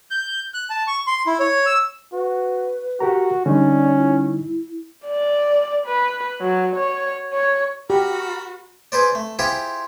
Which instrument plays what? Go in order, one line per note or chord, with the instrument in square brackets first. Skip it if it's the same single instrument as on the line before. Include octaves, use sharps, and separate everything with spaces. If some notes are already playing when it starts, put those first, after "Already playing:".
[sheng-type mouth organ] G6
F#6
A5
C#6
C6
E4
C#5
E6
[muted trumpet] F#4 [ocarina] B4
[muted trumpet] F#4 [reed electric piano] G4 A#4 A#5
[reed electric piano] D3 G3 D#4 [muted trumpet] C#4 [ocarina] D5
[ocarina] E4
[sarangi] D5
B4
F#3
C#5
C#5
[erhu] F#4 [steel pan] G4 [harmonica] A#4 B5
[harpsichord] G#4 B4 C5 D5
A3
E4 F4 G4 G#4 C5